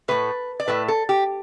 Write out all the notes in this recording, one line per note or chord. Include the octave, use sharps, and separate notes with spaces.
A2 A3 B4
D5
A2 A3 B4
A4
G4